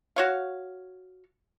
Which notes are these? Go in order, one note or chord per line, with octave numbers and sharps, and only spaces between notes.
F#4 C#5 F5